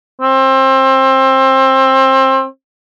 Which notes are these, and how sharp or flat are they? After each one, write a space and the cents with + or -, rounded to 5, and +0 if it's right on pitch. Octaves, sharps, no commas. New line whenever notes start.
C4 +25